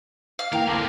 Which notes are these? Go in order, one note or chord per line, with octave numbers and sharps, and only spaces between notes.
F5
E3 A#3 A#4 F5 G5
C2 D3 A#3 C4 A5 D6